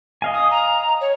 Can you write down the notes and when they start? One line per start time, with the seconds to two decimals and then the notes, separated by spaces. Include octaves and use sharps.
0.22 D#5 F5 G#5
0.34 D#6
0.51 A#5
1.01 C#5